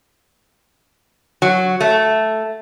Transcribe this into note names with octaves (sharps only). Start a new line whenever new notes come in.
F#3
A3